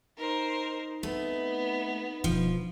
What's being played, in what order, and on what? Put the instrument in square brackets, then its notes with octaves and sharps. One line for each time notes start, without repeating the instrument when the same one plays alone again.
[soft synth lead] D#4 [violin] A#4 C5
[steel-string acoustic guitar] A3 [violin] B3 [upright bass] C4
[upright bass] E1 D3 [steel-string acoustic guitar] F3